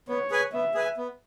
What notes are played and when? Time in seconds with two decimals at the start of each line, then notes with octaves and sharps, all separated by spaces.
0.09 B3 C#5
0.31 G#4 B4 G#5
0.53 B3 E5
0.74 G#4 B4 G#5
0.97 B3